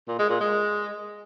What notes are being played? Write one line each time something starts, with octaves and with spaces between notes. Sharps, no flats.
A#2
G#3
A#2
G#3